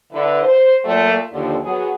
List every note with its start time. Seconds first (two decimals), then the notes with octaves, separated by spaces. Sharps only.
0.11 D3 E4 B4
0.43 C5
0.85 A#2 F#3 A3
1.31 D#2 D3 F3
1.63 F#3 B3 G#4